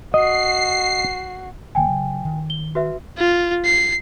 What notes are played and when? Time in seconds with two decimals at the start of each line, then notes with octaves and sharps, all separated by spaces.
0.14 F#4 D#5 C7
1.75 D#1 D#3 A#3 G5 G#5
1.87 C#3 F#3
2.25 D#3
2.50 G7
2.75 F#4 B4 E5
3.17 F4
3.65 C7